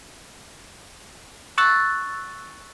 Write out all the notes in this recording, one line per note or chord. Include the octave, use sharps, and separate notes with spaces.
C#6 E6 F#6 A6